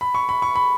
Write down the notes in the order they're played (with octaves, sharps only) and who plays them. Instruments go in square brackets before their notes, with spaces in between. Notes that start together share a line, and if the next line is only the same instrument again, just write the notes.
[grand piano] B5
C#6
B5
C#6
B5